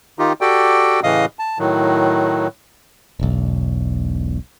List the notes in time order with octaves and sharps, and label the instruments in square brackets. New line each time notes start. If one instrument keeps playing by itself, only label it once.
[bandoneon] D#3 D#4 F4 G4
F#4 G4 A4 D5 G5
A2 C#3 E3 D#5 F5 D#6
A5
A2 D#3 F#3
[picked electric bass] E1 B1